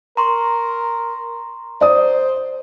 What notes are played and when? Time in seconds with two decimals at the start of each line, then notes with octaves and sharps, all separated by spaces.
0.17 A#4 A#5 C6 C#6
1.81 C5 D5 D#6